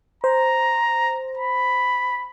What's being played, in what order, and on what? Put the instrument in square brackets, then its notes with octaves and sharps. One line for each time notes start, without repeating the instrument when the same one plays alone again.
[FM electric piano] C5 [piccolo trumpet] A#5
[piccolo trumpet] B5